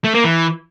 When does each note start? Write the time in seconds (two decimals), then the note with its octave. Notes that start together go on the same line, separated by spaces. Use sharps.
0.04 A3
0.14 A#3
0.25 E3